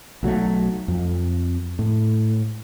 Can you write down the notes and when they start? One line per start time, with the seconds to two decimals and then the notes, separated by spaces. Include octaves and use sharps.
0.23 B1 F#3 G3 A3
0.88 F2
1.79 A2